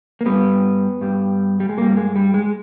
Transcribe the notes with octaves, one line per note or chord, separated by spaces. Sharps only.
A#3
G2 G3 B3
G2 G3
G3
G#3
G2 G3 A#3
G#3
G3
G#3